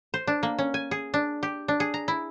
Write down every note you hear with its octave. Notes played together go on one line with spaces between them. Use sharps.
C5
D4
A#3
C#4
G#5
G#4
D4
G4
D4
G#4
A#5
E4